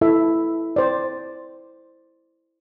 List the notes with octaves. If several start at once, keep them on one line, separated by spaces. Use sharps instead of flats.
E4 A4 E5
C5 D5